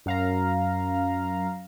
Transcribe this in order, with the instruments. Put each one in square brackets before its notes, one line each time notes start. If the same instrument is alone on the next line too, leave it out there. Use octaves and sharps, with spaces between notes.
[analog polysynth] F#2 F5 A#5